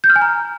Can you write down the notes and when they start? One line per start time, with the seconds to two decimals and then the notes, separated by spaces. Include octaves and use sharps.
0.04 G6
0.10 F6
0.16 G#5
0.22 A#5